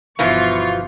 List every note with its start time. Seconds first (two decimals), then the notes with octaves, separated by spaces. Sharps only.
0.19 G1 B2 E3 F3 F4 C#6